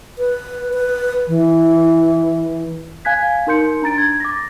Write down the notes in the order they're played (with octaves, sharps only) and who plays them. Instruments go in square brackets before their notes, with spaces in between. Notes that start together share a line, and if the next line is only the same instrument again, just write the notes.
[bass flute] B4
B4
E3
[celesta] F5 G#5 F#6 G#6 B6
D#4 A#4 C6 G6 C#7
D4 A#5 A6 D7
G#6
D6 A6 A#6